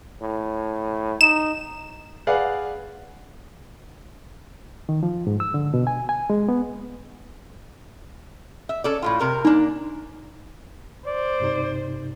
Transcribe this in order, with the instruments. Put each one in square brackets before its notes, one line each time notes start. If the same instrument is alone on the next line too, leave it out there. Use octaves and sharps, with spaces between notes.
[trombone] A2
[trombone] D#4 [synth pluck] E7
[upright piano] G#4 B4 D5 F5 F#5
[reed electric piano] D#3
F3
G#2
E6
D3
B2
G#5
G#5
G#3
B3
[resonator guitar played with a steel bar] E5
C#4 A4 D5
A2 C3 F4
C3 A#4 A#5
[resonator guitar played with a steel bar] A#3 D4 [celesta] D#4
[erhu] C5 [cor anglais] D5
[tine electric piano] G2 C3 D#4